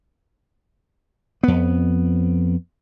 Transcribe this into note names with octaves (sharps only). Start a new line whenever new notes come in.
F2 B3